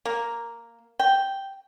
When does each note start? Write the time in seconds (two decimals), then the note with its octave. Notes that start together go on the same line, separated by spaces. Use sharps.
0.05 A#3
0.99 G5